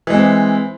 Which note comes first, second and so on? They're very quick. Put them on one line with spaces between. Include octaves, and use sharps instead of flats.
E3 G#3 C4